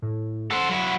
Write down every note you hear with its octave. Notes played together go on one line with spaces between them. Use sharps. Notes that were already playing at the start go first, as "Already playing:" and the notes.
A2
A4 C5 F#5
F#3 E4